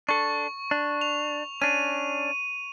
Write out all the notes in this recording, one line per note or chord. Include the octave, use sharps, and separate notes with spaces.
D4 A4 C#6
D4
F7
C#4 D4 D#7